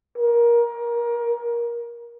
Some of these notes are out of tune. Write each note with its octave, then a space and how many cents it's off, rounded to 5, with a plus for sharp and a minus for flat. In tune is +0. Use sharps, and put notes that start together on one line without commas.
A#4 +25